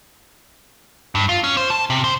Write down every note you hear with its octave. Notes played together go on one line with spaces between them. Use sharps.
G2
F4
C#4
C5
A5
C3
C5